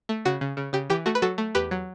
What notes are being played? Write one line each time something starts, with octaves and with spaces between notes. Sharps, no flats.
A3
C#3 F#4
C#3
C#3
C#3 G4
E3 G4
A3 F#4
B4
F#3 F#4 A4
A3
E2 G4 B4
F#3